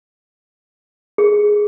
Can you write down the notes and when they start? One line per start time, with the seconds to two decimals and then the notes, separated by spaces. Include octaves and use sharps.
1.18 G#4